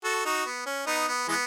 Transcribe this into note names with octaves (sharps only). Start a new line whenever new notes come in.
F#4 A4
D#4 F#4
B3
C#4
B3 D#4
B3
E3 G#3 B3